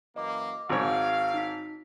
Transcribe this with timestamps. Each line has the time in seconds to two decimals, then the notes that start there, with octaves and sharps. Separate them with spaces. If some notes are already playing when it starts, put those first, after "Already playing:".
0.16 F#2 E3 A#3 D#5 D6
0.70 G#1 G#2 C#5 F5
1.34 D#4 B6